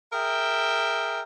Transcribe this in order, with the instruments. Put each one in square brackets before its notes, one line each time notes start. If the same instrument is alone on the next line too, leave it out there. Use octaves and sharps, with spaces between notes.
[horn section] G#4 A#4 E5 G5